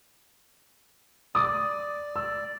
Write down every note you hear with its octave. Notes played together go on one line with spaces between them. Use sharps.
D5 D6 D#6
E6